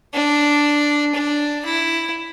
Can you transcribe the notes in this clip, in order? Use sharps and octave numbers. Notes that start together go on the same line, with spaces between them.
D4
D4
E4